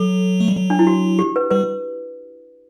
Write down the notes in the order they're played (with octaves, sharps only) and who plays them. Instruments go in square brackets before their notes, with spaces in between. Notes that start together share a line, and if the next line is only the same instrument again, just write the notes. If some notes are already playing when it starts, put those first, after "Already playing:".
Already playing: [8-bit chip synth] F#3 [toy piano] A4
[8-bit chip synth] A3
G3
F#3
[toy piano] D4
E4
F#4
G4
B4
[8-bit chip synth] G3 [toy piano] B4